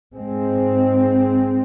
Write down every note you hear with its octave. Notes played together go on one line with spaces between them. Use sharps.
G#2 G#3 C4